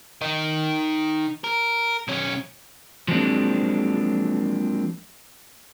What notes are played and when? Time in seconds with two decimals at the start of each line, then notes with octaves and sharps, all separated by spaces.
0.21 D#3 D#4
1.44 A#4
2.08 B1 C#4
3.08 F3 F#3 G#3 A#3 C4 D4